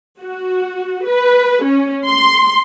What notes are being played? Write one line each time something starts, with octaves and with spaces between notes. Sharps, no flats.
F#4
B4
C#4
C6